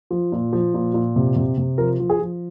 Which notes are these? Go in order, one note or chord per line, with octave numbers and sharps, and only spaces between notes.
F3
A#2
F3
A#2
A#2
C3
C3
C3
F3 A#4
F3
G#4
F3